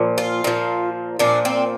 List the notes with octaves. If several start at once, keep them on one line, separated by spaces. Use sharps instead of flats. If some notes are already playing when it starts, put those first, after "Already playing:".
Already playing: A#2 F3
F4
A#2 F3
A#2 F3 D4
C4